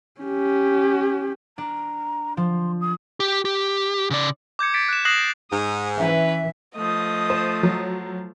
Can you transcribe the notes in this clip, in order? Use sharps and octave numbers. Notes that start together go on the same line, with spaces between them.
C#4 G4
D4 A#5
F3 C6
D#6
G4
G4
C#3 D5
D6 G6 G#6 C#7
A6 B6 D7
F#6 E7
D#6 F#6 A#6 C7 E7 F#7
G#2 D#6
E3 C#4 B4 E5
F3 A3 D#5 D#6
C5
F#3